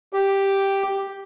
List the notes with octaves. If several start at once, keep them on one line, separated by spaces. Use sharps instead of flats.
G4